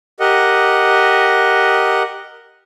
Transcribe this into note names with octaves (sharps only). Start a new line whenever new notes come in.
G4 A#4 D#5 F#5